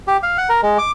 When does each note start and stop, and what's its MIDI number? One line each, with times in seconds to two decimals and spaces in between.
0.08 0.17 67
0.23 0.37 77
0.38 0.49 78
0.49 0.61 70
0.63 0.78 56
0.78 0.91 86